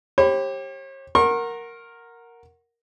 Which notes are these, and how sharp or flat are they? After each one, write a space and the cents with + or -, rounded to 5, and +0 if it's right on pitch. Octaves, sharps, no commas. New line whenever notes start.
G4 +0 C#5 -45 B5 +20
A#4 +0 F#5 -5 C#6 -45